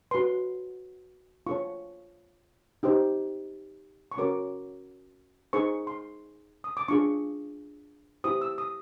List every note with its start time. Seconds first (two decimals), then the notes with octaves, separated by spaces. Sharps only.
0.11 F#4 B4 C6
1.47 F4 A4 C#5 C#6
2.83 D#4 G4 C5
4.12 C#6
4.17 C#4 F#4 A#4 C#5 D6
5.53 D#4 G#4 C5 C#6
5.87 C6
6.64 D#6
6.77 D6
6.88 D4 F4 G#4 C#6
8.24 E4 G4 C5 D#6
8.42 E6
8.58 D#6